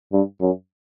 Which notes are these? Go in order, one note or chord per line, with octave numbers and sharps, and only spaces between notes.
G2
F#2